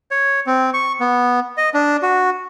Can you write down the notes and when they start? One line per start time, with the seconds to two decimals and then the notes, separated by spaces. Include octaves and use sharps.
0.11 C#5
0.47 C4
0.74 C#6
1.00 B3
1.57 D#5
1.74 D4
2.03 F#4